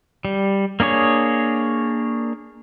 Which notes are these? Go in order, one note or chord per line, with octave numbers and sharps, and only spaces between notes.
G3
A#3 D4 G#4 C#5